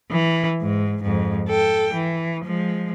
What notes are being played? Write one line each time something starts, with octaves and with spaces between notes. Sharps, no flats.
E3
G#2
F2 G#2
A4 G5
E3
F3 G#3